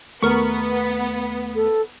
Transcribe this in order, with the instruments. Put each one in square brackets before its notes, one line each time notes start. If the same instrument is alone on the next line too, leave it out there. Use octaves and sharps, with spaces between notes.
[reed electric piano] D#2 A3 [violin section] B3 [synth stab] A#4 C#6
[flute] A4